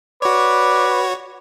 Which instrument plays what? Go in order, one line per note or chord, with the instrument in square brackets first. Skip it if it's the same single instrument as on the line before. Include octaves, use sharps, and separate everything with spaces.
[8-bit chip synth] F#4 C#5 [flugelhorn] B4 [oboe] D5